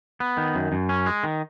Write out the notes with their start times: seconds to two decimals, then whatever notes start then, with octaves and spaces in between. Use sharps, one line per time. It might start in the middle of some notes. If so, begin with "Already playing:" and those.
0.20 B3
0.37 D#3
0.55 F#2
0.72 F#2
0.89 C#4
1.06 G#3
1.24 D#3